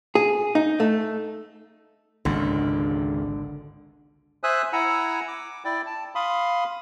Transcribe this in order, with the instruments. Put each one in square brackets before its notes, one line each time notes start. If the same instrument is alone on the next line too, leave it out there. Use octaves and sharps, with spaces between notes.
[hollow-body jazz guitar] G#4
D#4
A3
[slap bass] G#1 C#2 [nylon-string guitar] D3
[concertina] C5 E5 G#5 D#6 E6 F#6
E4 F#5 G#5 A#5 E6
D6
E4 D5 G5
A5
F5 B5 C6 D#6